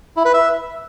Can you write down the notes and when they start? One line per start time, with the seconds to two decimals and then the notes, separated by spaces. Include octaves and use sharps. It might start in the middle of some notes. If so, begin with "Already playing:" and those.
0.17 E4
0.25 B4
0.34 E5